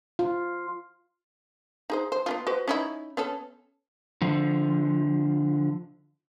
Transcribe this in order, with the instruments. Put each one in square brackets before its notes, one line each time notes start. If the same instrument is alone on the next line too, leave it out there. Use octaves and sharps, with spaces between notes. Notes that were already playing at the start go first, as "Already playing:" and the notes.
[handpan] F4
[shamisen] D#4 G#4 C5
C5
B3 C#4 F4
F#4 B4 C5
C#4 D#4 E4
B3 C#4 A4
[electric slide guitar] D3 F3